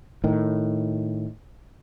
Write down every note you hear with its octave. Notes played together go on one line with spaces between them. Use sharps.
A2 D#3